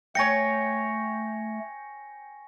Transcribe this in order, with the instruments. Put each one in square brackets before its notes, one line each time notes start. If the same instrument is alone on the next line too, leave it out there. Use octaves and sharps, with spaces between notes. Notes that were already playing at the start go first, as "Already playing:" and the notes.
[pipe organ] A3 [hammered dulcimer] C#5 G5 [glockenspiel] G#5 A#6 C#7